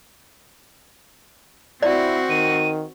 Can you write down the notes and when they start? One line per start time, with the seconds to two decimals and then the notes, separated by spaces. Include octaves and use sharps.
1.83 C4 E4 F#4 D5
2.30 D#3 D#7